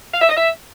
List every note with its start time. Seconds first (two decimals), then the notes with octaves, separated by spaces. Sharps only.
0.14 F5
0.22 E5
0.29 D#5
0.37 E5